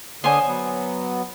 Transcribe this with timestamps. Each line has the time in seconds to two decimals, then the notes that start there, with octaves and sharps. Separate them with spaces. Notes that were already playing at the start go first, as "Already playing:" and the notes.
0.24 D3 C5 C#5 G#5 D#6
0.48 F#3 B3